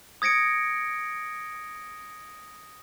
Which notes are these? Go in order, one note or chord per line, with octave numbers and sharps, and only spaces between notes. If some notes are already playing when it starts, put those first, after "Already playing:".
D#6 G#6 A#6 C#7 D7